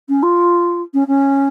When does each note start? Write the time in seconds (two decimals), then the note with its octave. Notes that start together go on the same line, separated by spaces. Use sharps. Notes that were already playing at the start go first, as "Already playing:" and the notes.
0.09 C#4
0.22 F4
0.94 C#4
1.07 C#4